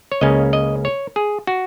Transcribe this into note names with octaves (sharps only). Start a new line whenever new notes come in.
C#5
C#2 C#3 A#3 C#4 D#5
D#5
C#5
G#4
F#4